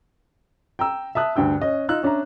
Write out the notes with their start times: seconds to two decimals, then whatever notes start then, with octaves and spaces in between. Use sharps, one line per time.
0.79 G5 A#5 E6
1.15 E5 A5 D#6 F#6
1.36 D2 G2 G5 E6
1.61 C#4 D#5
1.89 D#4 F4 E6 F#6
2.03 C#4 D4 E5 A#5